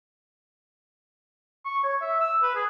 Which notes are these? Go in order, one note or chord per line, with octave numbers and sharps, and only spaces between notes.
C#6
C#5
E5
E6
B4
G#4